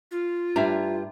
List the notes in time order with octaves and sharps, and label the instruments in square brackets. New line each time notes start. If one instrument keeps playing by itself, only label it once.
[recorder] F4
[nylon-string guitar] G2 G3 D4 [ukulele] E4 E5 A#5